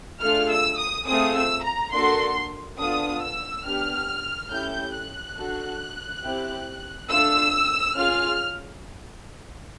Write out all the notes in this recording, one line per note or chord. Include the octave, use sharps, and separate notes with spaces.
A3 D4 F4 G#4 F6
E6
D#6
A3 C4 F4 G#4 D#6
E6
A#5
A#3 D4 F#4 A4 C6
B3 D4 F4 A4 D#6
E6
B3 D4 G4 F6
A3 C#4 E4 G4 G6
F#6
D4 F#4 A4
C4 E4 G4
A3 D4 F4 A4 E6
C#4 F4 G#4 F6